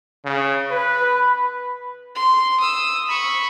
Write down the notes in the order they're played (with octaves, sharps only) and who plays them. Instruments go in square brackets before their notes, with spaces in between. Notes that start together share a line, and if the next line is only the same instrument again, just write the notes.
[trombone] C#3
[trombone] B4 [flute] B5
[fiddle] C6
D#6 E6
B5 C#6